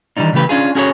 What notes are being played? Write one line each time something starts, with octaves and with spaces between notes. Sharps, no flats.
D#3 E3 G3 D4 D#4
C#3 E3 A3 G4 B4
C#4 D4 F4 G#4
C#4 F#4 G#4 A4 C5 C#5